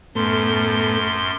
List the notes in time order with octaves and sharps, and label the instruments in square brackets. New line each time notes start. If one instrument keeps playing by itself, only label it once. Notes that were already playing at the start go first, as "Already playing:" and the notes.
[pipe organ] F#2 C6 [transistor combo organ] A2 A3 B3